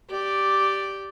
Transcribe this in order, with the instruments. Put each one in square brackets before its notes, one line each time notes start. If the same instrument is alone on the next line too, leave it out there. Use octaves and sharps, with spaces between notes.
[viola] G4 D5